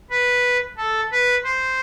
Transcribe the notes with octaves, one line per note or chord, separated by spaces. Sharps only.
B4
A4
B4
C5